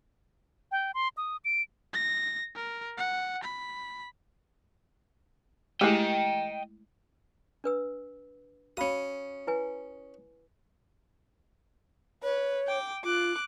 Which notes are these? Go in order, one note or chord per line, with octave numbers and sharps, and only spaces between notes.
G5
C6
D#6
D7
A#6
A#4
F#5
B5
G#3 A3 E4 G4 G#4 D#5 G5
D4 B4 E6
C#4 F#4 F5 B5 D#6
E4 B4 G#5
B4 C#5
G5 D6
F4 D6 F#6